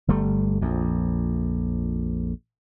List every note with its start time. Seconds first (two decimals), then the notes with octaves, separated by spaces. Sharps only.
0.08 G1 G3 A3
0.61 A#1 F2